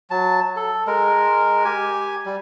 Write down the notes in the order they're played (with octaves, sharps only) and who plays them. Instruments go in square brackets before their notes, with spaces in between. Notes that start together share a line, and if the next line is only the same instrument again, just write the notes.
[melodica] F#3 A5
A4
G#3 A#4
G4 G#5
G3